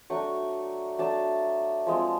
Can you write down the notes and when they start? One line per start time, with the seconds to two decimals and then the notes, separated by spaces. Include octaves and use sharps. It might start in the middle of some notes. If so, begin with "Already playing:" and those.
0.10 F#3 A3 D4 C#6
0.99 F#3 A3 D4 A5
1.87 F3 G#3 C4